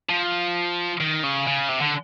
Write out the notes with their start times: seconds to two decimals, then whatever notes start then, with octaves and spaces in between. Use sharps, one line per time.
0.09 F3
1.00 D#3
1.23 C#3
1.47 C#3
1.69 C3
1.81 D3